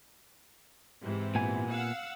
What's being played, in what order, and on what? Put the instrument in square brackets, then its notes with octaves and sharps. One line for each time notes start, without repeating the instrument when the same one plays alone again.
[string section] G#2 C3 E3
[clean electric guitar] A#2 B3 G#5
[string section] F5 F#5 E6